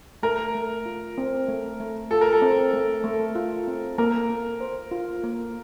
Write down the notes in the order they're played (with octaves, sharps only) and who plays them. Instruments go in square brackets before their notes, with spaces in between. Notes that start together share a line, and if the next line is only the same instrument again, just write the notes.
[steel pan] A3 [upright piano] A#4
[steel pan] A3
F4
C4
A3
A3
[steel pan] F4 [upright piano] A4
[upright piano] A#4
A4
[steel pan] C4
A3
A3
F4
C4
[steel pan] A#3 [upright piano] A#4
[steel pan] A#3
C5
F4
A#3